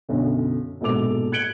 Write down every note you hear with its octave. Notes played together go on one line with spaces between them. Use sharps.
B1 F#2 D3
A#1 G#2 B2 A4 D6 F7
F#6 G#6 C#7 D7 F#7 G7